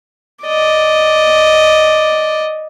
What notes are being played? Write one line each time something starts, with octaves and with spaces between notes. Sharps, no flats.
D5 D#5